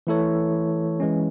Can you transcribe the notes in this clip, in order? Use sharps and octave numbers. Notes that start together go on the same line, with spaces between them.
E3 A3 E4 A4 C#5
E3 G#3 C#4